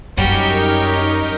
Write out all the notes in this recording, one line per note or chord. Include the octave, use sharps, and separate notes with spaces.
F#2 F#3 G3 C#4 D#4 G4 A#4 C#5